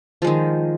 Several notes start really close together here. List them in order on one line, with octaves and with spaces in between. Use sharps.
F3 G#3 D#3